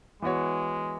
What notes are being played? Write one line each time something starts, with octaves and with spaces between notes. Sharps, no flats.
E3 G#3 B3 F#4 C#5